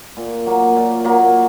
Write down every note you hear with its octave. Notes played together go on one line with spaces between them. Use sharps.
A#2
F#3 A#3
A#2
F#3 A#3